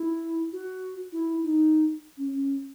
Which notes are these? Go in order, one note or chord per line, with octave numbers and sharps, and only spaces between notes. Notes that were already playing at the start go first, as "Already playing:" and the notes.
Already playing: E4
F#4
E4
D#4
C#4
C#4